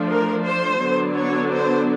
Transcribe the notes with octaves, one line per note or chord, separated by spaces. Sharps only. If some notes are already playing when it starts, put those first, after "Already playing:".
Already playing: F3 A3 D4
A#4
C5
D3 F#3 B3 D4
C#5
C5